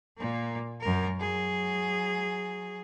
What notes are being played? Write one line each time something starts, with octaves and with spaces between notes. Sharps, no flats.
A#2 A#3
F#2 A#4
F#3 G#4